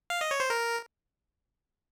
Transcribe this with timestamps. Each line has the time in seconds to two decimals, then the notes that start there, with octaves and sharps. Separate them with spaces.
0.10 F5
0.21 D#5
0.31 C#5
0.40 C5
0.50 A#4